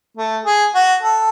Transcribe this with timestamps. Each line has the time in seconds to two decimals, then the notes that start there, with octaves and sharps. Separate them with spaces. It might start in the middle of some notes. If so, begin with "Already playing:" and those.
0.17 A3
0.45 G#4
0.74 F#4
1.03 A4